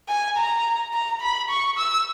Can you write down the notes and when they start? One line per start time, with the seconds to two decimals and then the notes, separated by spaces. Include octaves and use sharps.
0.08 G#5
0.37 A#5
0.93 A#5
1.21 B5
1.50 C#6
1.78 E6